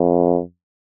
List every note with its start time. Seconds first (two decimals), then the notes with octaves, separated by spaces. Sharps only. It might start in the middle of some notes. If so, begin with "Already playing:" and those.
Already playing: F2